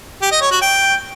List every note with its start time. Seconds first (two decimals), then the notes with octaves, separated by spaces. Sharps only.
0.22 G4
0.32 D#5
0.42 C#5
0.51 F#4
0.61 G5